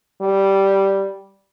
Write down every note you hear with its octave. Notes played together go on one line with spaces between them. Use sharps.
G3